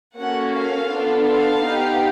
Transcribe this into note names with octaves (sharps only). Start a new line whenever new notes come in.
A#3 C#4 F#4 A4 F#5
F5
B3 D4 F4 A4
F5
B3 D#4 G4